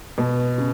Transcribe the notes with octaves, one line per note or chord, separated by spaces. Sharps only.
B2
C#3